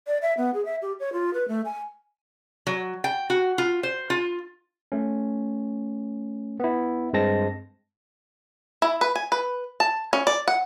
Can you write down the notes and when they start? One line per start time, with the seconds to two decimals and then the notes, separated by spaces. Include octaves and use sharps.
0.07 D5
0.22 E5
0.37 B3
0.54 G#4
0.65 E5
0.82 G4
1.00 C#5
1.13 F4
1.34 B4
1.48 A3
1.65 G#5
2.67 F#3
3.04 G5
3.30 F#4
3.58 F4
3.83 C5
4.10 F4
4.92 A3 C#4
6.60 B3 E4
7.13 G2 G#3 C4 A5 A#6
8.82 E4
9.01 B4
9.15 G#5
9.32 B4
9.80 A5
10.13 C#4
10.27 D5
10.48 F#5